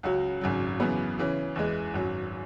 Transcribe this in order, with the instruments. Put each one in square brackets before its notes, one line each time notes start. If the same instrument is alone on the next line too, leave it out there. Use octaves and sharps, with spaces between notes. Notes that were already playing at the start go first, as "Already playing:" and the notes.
[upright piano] C#2 C#3 F#3 C#4 F#4
G#1 F#2 C#3 F#3
F#2 C#3 E3 B3
C#3 E3 C#4
E2 E3 G#3
G#1 F#2 F#3